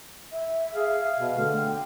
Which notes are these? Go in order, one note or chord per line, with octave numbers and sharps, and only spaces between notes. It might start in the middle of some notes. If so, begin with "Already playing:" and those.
E5
G#4 F5
B2
D3 A3
G5